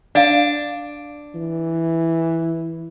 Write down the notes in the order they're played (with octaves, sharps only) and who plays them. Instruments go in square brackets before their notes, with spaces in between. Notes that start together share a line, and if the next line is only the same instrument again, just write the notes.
[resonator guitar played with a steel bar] D4 [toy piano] D5 F5
[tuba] E3